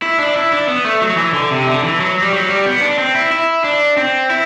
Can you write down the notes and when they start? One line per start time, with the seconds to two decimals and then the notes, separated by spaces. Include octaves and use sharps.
0.02 E4
0.19 D4
0.36 E4
0.52 D4
0.68 B3
0.84 A3
1.02 F#3
1.17 E3
1.34 D3
1.51 C3
1.67 D3
1.83 E3
2.00 F#3
2.22 G3
2.32 F#3
2.49 G3
2.66 B3
2.82 D4
2.98 C4
3.15 E4
3.32 E4
3.64 D4
3.97 C4
4.30 E4